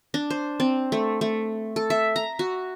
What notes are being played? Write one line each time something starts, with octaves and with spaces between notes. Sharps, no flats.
D4
C5
C4
A3
A3
A4
E5
A#5
F#4